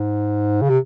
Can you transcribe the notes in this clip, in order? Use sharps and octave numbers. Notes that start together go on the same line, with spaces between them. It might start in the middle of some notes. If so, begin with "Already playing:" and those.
Already playing: G#2
C#3
C3